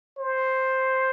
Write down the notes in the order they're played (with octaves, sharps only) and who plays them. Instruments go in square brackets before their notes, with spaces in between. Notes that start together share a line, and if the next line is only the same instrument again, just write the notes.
[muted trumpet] C5